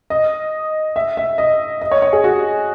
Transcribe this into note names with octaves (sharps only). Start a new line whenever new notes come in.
D#5
E5
E5
D#5
D#5
C#5
C#5
G#4
F#4